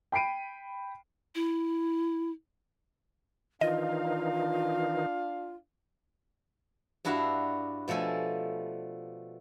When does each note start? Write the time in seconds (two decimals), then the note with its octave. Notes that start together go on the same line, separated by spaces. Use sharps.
0.12 G5 B5 C7 D7 D#7
1.35 E4
3.61 D#3 E3 D4 D#4 F4 D#5 F5
7.05 G2 D4 E4 F#4 E5 F5
7.88 B2 F3 A3 A4 G#5